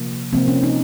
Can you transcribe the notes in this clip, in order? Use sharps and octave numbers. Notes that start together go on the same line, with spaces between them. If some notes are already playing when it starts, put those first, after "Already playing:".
Already playing: C3 F3 A#3
C3 F3 A#3 C4
C#4
D#4